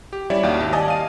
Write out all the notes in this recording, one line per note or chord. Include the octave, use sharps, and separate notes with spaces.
G4
G3 C#4 E4 C#5 D5 E5
D#2 F#4 G4 E5 F5
G#1 G4
D5 D#5 G#5 A5 D#6 A#6
F5 D#7